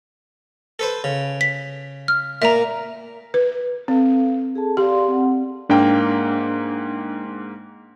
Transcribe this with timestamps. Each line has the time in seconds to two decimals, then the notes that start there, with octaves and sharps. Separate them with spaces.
0.79 A4 B4 C5
1.04 C#3
1.41 B6
2.08 F6
2.42 A#2 A#3 E5 A#5
3.34 B4
3.88 C4 A4 F5
4.55 G#4 A4 A5
4.77 G4 D5 F5 C6
5.08 C4 F#5
5.70 G#2 A#3 D4 G5